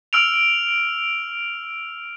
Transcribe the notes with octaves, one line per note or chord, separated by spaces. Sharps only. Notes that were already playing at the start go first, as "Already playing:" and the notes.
E6 F6 D7 F7